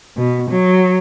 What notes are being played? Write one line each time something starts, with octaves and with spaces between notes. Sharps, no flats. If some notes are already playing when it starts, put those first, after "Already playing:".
B2
F#3